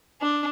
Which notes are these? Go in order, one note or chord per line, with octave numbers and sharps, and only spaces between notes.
D4